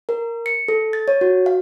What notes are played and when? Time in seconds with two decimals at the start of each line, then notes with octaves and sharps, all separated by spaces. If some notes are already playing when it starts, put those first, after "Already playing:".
0.09 A#4
0.46 C#7
0.68 A4
0.93 A6
1.08 C#5
1.21 F#4
1.46 F5